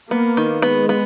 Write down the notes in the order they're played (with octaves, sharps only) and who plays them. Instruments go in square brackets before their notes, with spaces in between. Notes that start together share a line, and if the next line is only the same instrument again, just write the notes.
[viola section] A#3 [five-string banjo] B3
[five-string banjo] D#3
[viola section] G#3 [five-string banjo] B3
[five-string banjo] B3